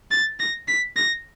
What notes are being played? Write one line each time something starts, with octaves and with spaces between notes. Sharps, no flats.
A6
A#6
B6
A#6